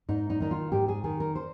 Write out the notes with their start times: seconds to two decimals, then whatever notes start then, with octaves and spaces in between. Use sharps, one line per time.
0.09 G#2 D#4
0.30 D#4
0.40 D#3 D#4
0.51 F4
0.72 G#2 G4
0.88 G#4
1.04 D#3 G#4
1.20 A#4
1.35 C5